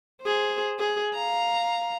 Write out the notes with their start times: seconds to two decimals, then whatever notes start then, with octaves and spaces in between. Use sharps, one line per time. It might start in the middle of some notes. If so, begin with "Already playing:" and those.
0.22 G#4 C5
0.79 G#4
1.14 F5 A#5